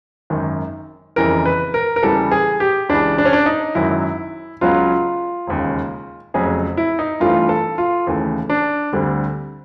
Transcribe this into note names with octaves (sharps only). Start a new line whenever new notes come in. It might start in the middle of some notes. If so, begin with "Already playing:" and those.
G#1 F#2 D#3
G1 F2 C#3 E3 G3 A#4
B4
A#4
A#4
E2 C#3 E3 G3 B3 A4
G#4
G4
C#2 C#3 E3 D4
D4
C#4
D4
D#4
G#1 F#2 D#3 F#3 E4
C#2 C#3 F#3 B3 F4
E1 D#2 C#3
F1 F2 C#3 F#3 G#4
E4
D#4
G2 E3 A3 C4 F4
A4
F4
D#2 C#3 E3 A3
D4
D2 D3 G3 C4